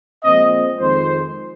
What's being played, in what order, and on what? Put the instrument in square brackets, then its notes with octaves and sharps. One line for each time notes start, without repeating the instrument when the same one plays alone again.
[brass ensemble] A#2 F3 G#3 C4 D#5
F2 D#3 G#3 C4 C5